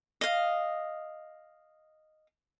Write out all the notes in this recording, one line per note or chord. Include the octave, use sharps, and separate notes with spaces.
D#5 F5